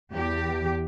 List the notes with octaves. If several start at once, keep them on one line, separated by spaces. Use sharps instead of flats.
E2 G4